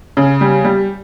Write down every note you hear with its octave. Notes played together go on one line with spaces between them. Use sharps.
C#3
G3
G3